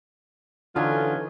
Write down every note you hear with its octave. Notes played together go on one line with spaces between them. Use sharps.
D3 E3 F#3 C#4 D#4 F4 A4 G#5